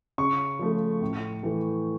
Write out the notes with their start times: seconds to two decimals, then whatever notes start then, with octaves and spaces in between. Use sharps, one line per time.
0.18 C#3 C#6
0.59 F3 A3
1.01 A2
1.43 E3 A3